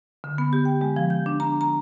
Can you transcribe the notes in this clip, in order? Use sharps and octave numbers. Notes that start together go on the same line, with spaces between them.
D3
B3
G4
G5
G#3
F3
G6
D4
A#5
A#5